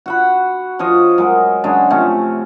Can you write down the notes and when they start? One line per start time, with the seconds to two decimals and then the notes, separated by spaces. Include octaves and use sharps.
0.06 F#4 F#5 B5
0.79 F3 F4 C#5 D#5
1.18 F#3 G#3 A#4
1.64 C#3 F#3 G#3 D4
1.90 C3 F3 A3 C#4